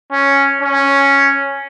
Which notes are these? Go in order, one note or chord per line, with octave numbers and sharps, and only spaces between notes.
C#4
C#4